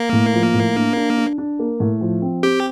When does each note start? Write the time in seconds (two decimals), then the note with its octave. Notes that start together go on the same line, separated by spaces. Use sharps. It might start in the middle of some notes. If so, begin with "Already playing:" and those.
Already playing: A#3
0.12 A2
0.34 F3
0.54 A2
0.76 D4
0.96 D4
1.17 D4
1.38 D4
1.59 A#3
1.80 A2
2.01 F3
2.22 C4
2.43 C4 G4